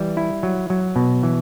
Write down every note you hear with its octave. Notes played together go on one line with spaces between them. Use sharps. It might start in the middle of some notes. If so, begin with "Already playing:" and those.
Already playing: E3 G3
E4
F#3
F#3
B2
E3